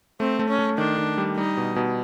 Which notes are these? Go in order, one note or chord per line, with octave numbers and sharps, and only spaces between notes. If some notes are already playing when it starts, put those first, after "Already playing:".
A3 C4
A3
C#4
A3
D#3 D4
D#3
G3
G3 D#4
B2
B2